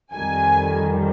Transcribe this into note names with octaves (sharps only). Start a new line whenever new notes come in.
F2 D#3 G3 G#5